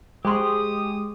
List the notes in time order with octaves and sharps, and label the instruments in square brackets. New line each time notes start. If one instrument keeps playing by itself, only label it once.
[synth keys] G#3 [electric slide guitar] G4 [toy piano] C5 C6 C#6 [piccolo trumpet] D#6